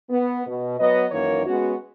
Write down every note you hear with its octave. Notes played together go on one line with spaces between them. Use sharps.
B3
B2
F#3 B3 B4 D#5
F#2 D#3 E3 A#3 C#5
G#3 B3 C#4 F#4